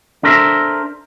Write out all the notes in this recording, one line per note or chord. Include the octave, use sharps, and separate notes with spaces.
D4 A4 A#4 C5 E5